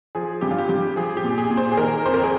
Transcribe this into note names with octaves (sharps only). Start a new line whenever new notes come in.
F3 G#4
G2 G4
F4
G4
G2 G4
F3 G#4
G4
A#2
G#4
A#2
C5
G#4
D#3 A#4
F2 C5
A#4
G#4